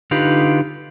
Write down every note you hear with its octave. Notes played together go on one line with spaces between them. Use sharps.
D3 D#4 F4 G4 B4